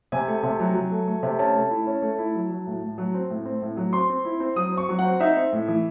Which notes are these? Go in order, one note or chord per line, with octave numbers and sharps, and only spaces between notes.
C3 G#5
A3
C3
F#3
F#3
A3
A3
C3
C#4 A5
A3
E4
C#4
A3
E4
F#3
F#3
A2
A2
F#3
C4
A2
C4
A2
F#3
C4 C6
C4
E4
C4
F#3 D#6
C4
C#6
F#3
F#5
C4
D#4 E5
C4
A2
E3